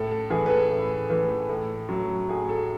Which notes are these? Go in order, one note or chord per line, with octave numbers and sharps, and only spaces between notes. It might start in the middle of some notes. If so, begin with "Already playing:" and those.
Already playing: A2 A4
A4
E3 A3 G#4
B4
A4
A2
E3 A3
A2
F#3 A3
A2 G#4
A4